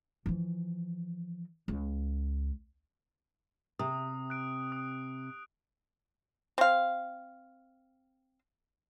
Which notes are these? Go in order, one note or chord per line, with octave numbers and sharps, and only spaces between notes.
E3 F3
C#2
C3 D#6
F#6 D7
D#6
C4 F5